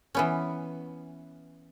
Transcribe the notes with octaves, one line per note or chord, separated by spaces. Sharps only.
E3 B3 C#4